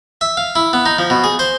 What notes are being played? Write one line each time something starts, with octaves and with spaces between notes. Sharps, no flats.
E5
F5
E4
B3
D#4
F3
B2
G#4
C5